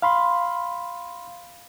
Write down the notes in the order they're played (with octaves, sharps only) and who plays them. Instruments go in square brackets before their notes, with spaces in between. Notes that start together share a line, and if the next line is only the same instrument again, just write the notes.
[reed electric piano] F5 B5 C6